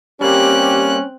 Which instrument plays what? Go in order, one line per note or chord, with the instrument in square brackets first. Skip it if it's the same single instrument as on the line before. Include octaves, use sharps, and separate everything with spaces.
[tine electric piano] G3 A#3 [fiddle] C4 F#6 [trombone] C#4 [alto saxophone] G4